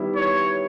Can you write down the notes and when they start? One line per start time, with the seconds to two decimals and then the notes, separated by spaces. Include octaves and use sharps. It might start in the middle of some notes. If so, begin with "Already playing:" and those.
Already playing: D#3 G3 B3 E4
0.16 C#5